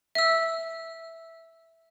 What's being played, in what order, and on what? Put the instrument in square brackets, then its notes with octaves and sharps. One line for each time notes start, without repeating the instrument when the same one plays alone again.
[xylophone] E5 E6